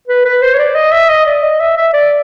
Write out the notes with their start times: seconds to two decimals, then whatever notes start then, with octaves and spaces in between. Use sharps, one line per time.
0.08 B4
0.25 B4
0.42 C5
0.55 C#5
0.59 D5
0.76 D#5
0.92 E5
1.09 D#5
1.26 D5
1.43 D#5
1.60 E5
1.77 E5
1.93 D5